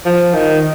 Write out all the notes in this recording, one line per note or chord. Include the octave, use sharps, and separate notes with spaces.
F3
D#3